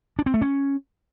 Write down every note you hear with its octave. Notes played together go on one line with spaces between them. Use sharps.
D4
C4
A3
C#4